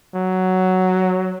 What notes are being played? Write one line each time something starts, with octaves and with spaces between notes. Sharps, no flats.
F#3